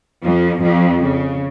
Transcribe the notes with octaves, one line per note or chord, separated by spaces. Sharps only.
F2 F3
F2 F3
C#3